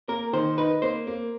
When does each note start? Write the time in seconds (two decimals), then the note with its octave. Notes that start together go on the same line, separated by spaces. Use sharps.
0.08 A#3 A#4
0.33 D#3 C5
0.58 D#4 B4
0.82 A#3 C5
1.07 A#3